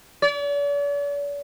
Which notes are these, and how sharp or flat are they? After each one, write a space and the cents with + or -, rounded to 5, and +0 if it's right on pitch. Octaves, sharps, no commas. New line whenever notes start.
D5 -45